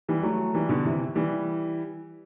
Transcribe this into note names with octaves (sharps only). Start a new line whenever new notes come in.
E3 G3
G3
F#3 A3
E3 G3
B2 D3
C3 E3
E3 G3